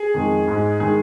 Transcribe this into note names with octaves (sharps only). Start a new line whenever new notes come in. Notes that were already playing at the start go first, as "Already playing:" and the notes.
Already playing: G#4
F2 D#3 G#3
G#2 G#3
D#3 G#3 G#4